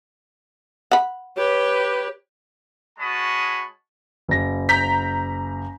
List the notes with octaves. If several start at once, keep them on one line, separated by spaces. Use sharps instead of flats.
F#5 B5
G4 B4 C#5
G#3 F#4 C#5 A5 B5 D#6
F#1 A#6
A#5 G6 B6